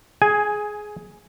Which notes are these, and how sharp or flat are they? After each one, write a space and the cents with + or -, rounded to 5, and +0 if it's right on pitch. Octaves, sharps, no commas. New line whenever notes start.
G#4 +15 G#5 +0